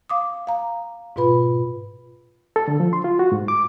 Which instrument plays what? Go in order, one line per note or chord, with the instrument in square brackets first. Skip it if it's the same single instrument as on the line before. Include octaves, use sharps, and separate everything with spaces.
[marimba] F5 D6 D#6
F5 A#5
G#2 B2 F4 B4 B5
[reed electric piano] A4
D3
F3
C6
F4
F#4
G#2
D6